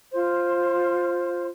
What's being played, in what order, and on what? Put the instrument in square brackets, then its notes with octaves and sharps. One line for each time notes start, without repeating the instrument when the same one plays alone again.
[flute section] F4 C5